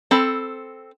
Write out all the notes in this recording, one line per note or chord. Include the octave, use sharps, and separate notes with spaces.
C4 A4 B5